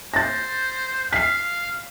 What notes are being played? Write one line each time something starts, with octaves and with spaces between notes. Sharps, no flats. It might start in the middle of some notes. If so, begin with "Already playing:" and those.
C5 A6 A#6
F5 B6 C7